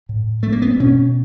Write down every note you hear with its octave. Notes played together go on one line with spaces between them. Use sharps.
A2
A3
A#3
B3
C4
B2 C#4